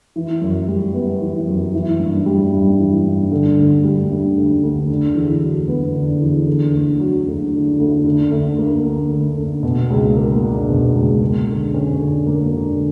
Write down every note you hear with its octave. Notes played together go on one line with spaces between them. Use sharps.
E3
F#2
G3
B3
E3
F#2
E3
G2
G3
G2
E3
G2
D3
D2
G3
D2
D3
D2
D3
E2
F#3
B3
D3
E2
D3
D2
F#3
D2
D3
D2
D3
D2
A#3
D2
D3
D2
B2
C#2
A#3
D4
B2
C#2
A#3
D3
C#4
D3
A#3
D3